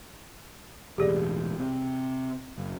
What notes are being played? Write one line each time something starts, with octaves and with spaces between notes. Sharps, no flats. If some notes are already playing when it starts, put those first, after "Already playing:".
E1 A1 G4 G#4 D5
C3
F#1